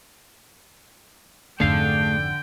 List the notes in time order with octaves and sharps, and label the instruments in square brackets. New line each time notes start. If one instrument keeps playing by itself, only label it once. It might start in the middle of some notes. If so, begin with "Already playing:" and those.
[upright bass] G#1 F2 [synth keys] D3 [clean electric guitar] A3 G#4 F5 [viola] G5